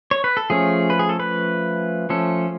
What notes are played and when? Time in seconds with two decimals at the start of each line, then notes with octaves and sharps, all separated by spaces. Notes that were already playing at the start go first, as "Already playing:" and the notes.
0.11 C#5
0.24 B4
0.37 A4
0.50 F3 A3 C#4 G#4
0.90 B4
0.99 G#4
1.09 A4
1.20 B4
2.10 F3 A3 C#4 A4